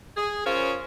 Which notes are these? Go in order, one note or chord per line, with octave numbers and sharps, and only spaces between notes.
G#4
C#4 F4 A#4 C5 C#5